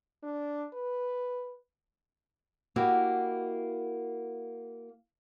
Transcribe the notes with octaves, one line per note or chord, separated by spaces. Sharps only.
D4
B4
A#3 E4 F#4 G4